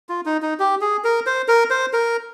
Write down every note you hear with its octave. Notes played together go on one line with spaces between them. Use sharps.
F4
D#4
D#4
G4
G#4
A#4
C5
A#4
C5
A#4